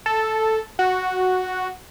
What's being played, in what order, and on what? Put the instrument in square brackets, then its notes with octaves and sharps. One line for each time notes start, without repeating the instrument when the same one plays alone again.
[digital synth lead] A4
F#4